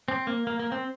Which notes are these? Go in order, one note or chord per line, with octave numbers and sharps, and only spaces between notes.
C4
A#3
A#3
A#3
C4